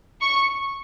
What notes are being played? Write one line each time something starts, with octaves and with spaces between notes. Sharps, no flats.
C#6